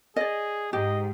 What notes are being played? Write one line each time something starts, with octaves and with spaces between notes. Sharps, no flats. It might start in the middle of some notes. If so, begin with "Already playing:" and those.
G#4 D5 D#5
G#2 G4 D#5